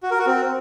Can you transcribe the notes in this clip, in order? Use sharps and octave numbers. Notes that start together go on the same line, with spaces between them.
F#4
A#4
F#4
C4